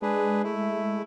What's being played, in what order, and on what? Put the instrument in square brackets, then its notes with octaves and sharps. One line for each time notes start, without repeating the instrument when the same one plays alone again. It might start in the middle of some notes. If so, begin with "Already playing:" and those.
[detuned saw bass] G#3 [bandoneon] D4 G#4 B4
[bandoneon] A3 E4